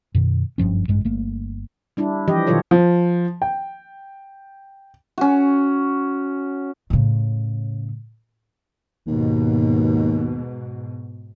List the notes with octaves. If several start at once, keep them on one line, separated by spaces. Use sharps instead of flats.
F#2 B2 D#3
F#1 G2 F3 C#4
A1 G2 G#3
G1 A3 A#3
G3 D4 E4
E3 F3 G4 D#5
B2 D#3 F#3 F4 A4 C#5
F3
G5
C#4 F#4
A2 C#3
D#2 G#2 B2